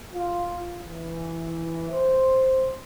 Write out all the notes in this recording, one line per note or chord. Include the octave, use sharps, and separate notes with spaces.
F4
E3
C5